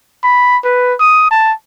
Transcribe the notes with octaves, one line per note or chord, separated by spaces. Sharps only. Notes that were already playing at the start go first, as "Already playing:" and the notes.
B5
B4
D#6
A5